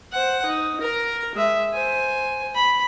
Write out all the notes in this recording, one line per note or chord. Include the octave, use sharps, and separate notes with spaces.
C5 F#5
D#4
A#4 A#5
G#3 E5
C5 G#5
B5